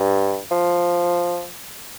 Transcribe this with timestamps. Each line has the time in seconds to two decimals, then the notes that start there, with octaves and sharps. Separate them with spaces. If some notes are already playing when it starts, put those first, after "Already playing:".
Already playing: G2
0.51 F3